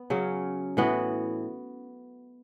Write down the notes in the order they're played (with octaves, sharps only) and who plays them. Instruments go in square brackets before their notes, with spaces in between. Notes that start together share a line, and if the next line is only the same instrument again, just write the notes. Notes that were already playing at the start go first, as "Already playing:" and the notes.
Already playing: [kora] B3
C#3 F#3 C#4
A2 E3 B3 F#4